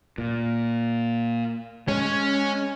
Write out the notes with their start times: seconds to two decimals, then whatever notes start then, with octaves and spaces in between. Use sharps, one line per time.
0.18 A#2
1.88 G#3 C#4 C#5